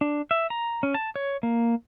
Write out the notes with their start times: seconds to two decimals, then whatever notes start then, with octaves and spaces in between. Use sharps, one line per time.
0.01 D4
0.31 E5
0.50 A#5
0.83 C#4
0.95 A5
1.16 C#5
1.43 A#3